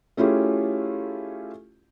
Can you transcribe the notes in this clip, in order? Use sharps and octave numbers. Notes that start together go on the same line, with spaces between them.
A3 C#4 E4 F4 G4 G#4